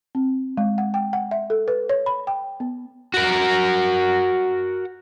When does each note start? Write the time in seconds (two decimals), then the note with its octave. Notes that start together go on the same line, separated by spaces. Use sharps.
0.15 C4
0.57 G#3
0.78 F#5
0.94 G5
1.13 F#5
1.31 E5
1.50 A4
1.68 B4
1.90 C#5
2.06 B5
2.27 G5
2.60 B3
3.14 F#4 A#4